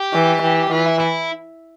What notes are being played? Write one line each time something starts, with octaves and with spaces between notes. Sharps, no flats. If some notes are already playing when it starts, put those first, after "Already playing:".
Already playing: G4
E3
E3
E3 F4
E4
E4